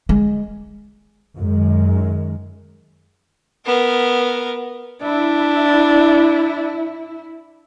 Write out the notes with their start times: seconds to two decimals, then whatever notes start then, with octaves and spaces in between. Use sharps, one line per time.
0.09 G#3
1.38 F#2 D#3 G#3
3.65 B3 A#4
5.03 D4 E4